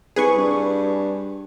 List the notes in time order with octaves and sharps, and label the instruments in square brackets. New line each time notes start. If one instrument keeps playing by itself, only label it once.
[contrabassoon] C2 [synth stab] G#4 B4 C#6
[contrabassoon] G2